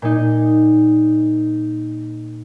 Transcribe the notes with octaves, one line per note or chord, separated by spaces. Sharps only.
A#2 D#4